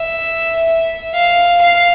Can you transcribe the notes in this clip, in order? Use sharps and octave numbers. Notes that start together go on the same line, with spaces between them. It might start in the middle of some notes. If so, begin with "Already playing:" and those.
Already playing: E5
F5
F5